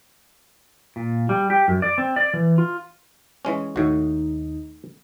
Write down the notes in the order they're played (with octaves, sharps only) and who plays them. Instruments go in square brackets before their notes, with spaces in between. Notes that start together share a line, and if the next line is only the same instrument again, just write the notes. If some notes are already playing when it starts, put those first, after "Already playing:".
[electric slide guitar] A#2
G3
G4
F#2
D5
C4
D5
E3
F4
[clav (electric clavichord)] E3 G#3 C#4 [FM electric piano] G#5
[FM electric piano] D#2 D#3 [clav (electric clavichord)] A2 F#4 [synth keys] D#4